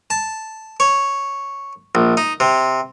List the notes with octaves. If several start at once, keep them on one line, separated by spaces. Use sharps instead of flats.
A5
C#5
A#1
D#4
C3